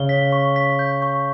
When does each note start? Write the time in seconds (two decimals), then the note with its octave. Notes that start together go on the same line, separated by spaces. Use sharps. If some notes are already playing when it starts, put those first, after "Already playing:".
Already playing: C#3 G7
0.09 B6
0.32 C#6
0.56 B6
0.79 G6
1.02 C#6